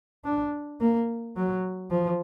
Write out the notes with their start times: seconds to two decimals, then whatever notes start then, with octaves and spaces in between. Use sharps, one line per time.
0.25 D4
0.80 A#3
1.36 F#3
1.91 F3